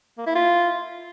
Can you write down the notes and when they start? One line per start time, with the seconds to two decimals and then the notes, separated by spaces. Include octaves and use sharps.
0.18 A#3
0.26 E4
0.35 F4